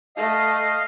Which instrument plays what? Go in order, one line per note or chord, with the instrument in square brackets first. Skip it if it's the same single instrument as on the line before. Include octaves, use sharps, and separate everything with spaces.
[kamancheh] A3 [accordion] D#5 F5